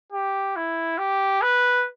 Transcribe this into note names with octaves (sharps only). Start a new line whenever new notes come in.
G4
E4
G4
B4